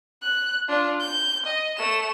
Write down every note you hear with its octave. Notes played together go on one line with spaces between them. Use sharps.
F#6
D4 F4
G6
D#5
A3 E7